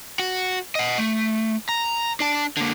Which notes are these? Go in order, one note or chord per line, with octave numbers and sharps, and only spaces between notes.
F#4
D#5 F#5
A3
A#5
D4 A5
D3 A#3